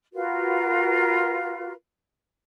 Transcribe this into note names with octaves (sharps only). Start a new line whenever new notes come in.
F4 F#4 A#4 B4